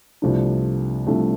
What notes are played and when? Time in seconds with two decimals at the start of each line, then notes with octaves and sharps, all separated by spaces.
0.22 C2 C3 F3 A3 D4
1.06 C2 C3 F3 A3 D4